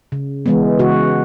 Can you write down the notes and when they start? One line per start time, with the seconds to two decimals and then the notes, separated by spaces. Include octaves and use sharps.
0.12 C#3
0.46 E3 G#3 B3
0.79 C#3 F#4